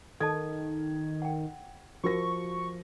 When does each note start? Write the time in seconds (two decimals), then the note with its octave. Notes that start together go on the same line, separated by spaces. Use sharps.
0.20 D#3 A4 D#5 A5 G#6
1.22 F#5 G5
2.04 F3 F#4 A#4 C#6 A#6